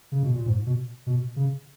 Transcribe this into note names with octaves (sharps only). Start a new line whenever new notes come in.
C#3
B2
A#2
G#2
B2
B2
C#3